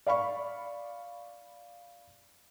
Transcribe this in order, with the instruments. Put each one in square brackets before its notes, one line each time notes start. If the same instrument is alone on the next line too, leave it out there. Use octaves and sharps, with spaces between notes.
[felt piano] D5 F5 B5 C#6